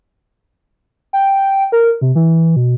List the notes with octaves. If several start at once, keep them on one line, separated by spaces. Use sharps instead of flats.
G5
A#4
C3
E3
B2